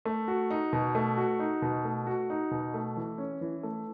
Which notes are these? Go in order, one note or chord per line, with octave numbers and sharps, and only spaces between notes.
A3
F#4
D#4
B2
A3
F#4
D#4
B2
A3
F#4
D#4
B2
A3
E3
C#4
E3
A3